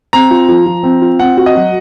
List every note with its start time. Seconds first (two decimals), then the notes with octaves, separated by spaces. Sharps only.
0.13 C4 A#5
0.31 F4
0.49 F3
0.66 F3
0.83 C4
1.02 F4
1.19 C4 F#5
1.37 F#4
1.46 D#5
1.55 F#3